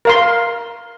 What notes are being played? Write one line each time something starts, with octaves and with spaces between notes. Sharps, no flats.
A#4 F5 C6